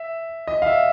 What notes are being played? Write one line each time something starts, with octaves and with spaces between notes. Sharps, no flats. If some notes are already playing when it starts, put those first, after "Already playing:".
Already playing: E5
D#5
F5
E5